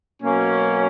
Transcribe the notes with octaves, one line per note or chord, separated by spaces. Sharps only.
B2 F#3 A#3 C#4